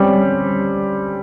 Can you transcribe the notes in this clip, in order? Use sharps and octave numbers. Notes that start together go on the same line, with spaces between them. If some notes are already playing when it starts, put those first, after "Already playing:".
Already playing: G3 C4 C#4